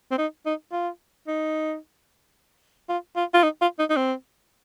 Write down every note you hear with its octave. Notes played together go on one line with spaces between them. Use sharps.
C4
D#4
D#4
F4
D#4
F4
F4
F4
D#4
F4
D#4
D#4
C4